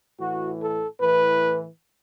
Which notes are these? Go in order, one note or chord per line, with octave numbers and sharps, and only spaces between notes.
A2 E3 F#4
A4
A2 E3 B4